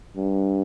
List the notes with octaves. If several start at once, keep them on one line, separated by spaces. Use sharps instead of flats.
G2